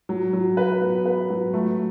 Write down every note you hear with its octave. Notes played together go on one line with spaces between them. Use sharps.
F#3
F#3
B4
B3
B4
F#3
A3